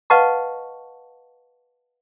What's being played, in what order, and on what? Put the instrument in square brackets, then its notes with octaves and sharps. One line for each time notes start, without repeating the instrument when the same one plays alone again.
[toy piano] B4 D#5 F5 F#5 A5 C#6